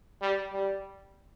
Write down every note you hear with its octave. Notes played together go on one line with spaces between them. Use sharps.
G3
G3